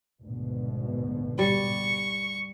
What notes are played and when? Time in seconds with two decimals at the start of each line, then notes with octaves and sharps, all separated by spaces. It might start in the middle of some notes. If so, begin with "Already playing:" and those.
0.22 G#1 D2 B2
1.39 G3 C#6